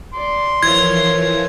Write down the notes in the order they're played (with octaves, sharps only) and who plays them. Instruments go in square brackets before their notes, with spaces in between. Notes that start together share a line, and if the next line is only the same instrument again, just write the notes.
[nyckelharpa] D5 [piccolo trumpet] C6
[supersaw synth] E3 F3 [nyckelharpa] A#4 C#5 [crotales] G#6